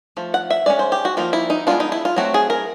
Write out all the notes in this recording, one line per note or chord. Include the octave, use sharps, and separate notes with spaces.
F3 A3
F#5
E5
G#3 C#4 D5
C5
G4
F#4
F3 A#3 D#4 F4
E4
D#4
G#3 B3 D4 F4
D#4
E4
F4
F#3 A3 C4 F#4
G#4
A#4